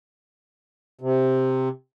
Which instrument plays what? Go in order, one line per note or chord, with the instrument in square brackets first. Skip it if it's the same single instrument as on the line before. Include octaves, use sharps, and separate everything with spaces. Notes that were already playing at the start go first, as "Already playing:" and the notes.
[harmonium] C3